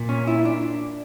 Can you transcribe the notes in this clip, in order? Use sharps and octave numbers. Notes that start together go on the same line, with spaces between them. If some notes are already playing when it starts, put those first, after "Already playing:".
Already playing: A#2
C#4
E4
D4